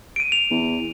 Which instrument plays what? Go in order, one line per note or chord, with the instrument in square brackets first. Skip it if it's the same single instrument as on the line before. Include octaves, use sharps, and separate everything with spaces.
[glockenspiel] D7 D#7
F7
[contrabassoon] E2